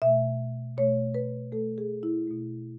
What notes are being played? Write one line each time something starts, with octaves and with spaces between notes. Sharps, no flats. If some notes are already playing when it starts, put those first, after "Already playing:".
B2 A3 E5
B2 A3 C#5
B4
B2 A3 A4
G#4
E4
B2 A3